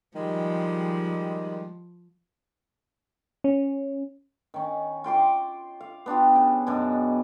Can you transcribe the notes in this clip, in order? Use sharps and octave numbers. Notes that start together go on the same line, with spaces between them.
D#3 F3 G3 G#3
C#4
D#3 C#4
F4 G5 C6 D6
F5
B3 D4 F4 G4
C#3
F#2 B2 G#3 D4